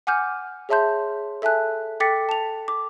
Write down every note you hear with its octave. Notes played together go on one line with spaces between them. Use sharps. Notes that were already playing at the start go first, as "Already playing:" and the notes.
F#5 G#5 D6 F6 G6
G#4 C#5 E5 A5 C6 G6
A4 E5 G#5 A5 F#6
A4 G5 D6 A6 B6 C#7
A5 F7
D6